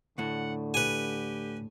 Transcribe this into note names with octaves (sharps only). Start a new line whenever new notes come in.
D2 A2 D3 F#5
G4 B4 G#5